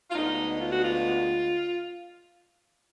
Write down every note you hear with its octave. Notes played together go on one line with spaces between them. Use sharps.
F4
D2 D3 G#3 B3 D#4
F4
F#4
F4